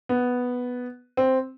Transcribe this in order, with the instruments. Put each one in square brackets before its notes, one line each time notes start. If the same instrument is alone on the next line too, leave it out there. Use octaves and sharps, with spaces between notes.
[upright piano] B3
C4